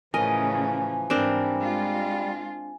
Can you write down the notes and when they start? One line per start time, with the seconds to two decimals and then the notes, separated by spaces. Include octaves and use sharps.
0.14 A2 C#3 E3 F3 C#4 A#4 D#5 G#5
1.10 G#2 E3 G3 C4 D4 A#4
1.60 G#3 F4